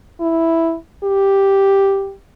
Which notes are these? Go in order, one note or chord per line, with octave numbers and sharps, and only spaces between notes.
E4
G4